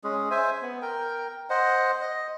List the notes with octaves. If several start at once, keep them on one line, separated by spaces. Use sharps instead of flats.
G#3 C#4 G#4
C5 E5 G#5
B3
A#4 G5
C5 D#5 F#5
D#5